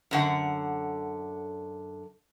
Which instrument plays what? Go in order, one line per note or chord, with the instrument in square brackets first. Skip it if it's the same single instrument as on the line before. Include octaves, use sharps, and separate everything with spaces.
[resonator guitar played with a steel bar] F#2 D3 F#5